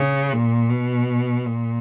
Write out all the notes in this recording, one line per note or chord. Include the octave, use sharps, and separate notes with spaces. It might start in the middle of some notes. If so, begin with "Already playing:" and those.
Already playing: C#3
A#2
B2
A#2